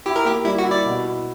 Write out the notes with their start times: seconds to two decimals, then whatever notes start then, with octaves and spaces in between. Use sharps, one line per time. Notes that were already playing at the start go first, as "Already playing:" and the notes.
0.06 E4 G4
0.16 A#4
0.25 A#3 G4
0.45 G3 E4
0.58 F#4
0.65 E4
0.71 D5
0.85 B2
1.05 E4